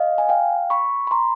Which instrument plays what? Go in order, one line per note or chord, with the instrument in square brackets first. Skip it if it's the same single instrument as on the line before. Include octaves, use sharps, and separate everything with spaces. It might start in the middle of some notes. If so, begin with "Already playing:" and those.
Already playing: [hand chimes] D#5 F5
G#5
F5 G5
B5 C#6
B5
A#5 C6